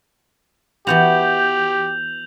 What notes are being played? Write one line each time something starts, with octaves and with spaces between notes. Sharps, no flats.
E3 B3 F#4 G4 G6 F7 F#7